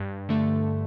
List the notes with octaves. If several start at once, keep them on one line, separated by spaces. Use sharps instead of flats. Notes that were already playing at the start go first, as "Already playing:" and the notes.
Already playing: G2
D3 A3